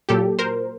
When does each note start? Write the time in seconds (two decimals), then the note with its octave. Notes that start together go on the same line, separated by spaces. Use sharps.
0.09 A#2 F#3 G4 A4
0.39 A#4 C5